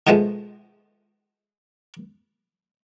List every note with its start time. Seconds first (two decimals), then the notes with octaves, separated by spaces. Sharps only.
0.07 G#2 B2 F3 G#3 A3